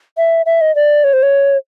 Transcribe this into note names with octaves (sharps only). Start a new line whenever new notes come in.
E5
E5
D#5
D5
C#5
C5
C#5